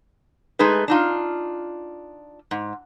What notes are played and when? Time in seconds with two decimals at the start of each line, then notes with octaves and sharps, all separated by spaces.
0.59 G#3 A3 D#4 G#4 B4
0.88 D4 D#4 F4
2.51 G#2